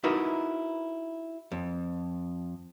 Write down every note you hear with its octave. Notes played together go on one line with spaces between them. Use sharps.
D#4 E4 F#4 A#4 B4 E5
F2